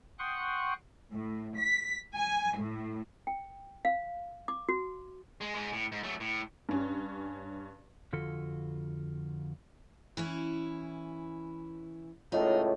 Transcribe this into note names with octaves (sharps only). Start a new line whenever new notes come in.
F#5 G5 C6 C#6 D#6 F#6
A2
B6
G#5
A2
G5
F5
D6
F#4
G#3
G#2 G#3
A2
G#2
F#3 A3
A2
G2 C#4
F2 D3 F4 F#4 A4
E3 C#4 E4
C#2 A2 D#4 F4 C#5 D#5